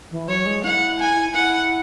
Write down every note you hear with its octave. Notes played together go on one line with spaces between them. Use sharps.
E3
F#3 C#5
G#3
E4 F#5
G#5
E4 F#5